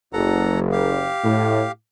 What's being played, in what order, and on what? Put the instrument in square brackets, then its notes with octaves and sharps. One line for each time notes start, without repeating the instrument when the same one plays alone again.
[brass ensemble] F#1 [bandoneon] A4 F#5 A#5
[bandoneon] G4 F5
[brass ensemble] A2